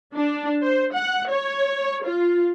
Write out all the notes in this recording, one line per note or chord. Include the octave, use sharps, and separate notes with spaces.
D4
C5
F#5
C#5
F4